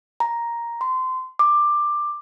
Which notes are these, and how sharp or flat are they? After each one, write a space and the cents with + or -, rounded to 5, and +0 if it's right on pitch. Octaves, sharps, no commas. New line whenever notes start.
A#5 +5
C6 -25
D6 +15